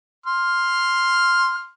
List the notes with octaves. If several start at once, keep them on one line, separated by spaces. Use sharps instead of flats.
C6 F6